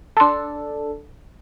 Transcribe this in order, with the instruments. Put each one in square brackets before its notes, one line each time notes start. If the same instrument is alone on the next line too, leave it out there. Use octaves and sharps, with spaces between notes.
[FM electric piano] D4 A4 [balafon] A5 C6